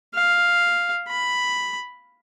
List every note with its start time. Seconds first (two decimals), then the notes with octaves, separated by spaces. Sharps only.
0.15 F5
1.08 B5